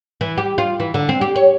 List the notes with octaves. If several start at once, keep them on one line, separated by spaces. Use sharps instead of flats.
E3
G4
F4
E3
D3
C4
G4
C#5